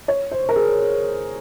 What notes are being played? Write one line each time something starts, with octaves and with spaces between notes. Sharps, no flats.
C#5
C5
A#4
G#4